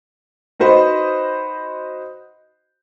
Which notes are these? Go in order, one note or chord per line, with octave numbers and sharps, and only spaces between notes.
D#4 F#4 B4 C5 D#5